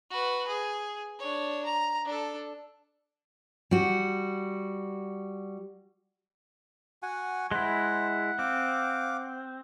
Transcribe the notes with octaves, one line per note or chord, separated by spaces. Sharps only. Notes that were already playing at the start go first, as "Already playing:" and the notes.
F#4 B4
G#4
D4 C#5
A#5
D4 A4
G3 F#4
F#4 F#5 G#5
G#3 E4 C5 F#5
C4 F5 D6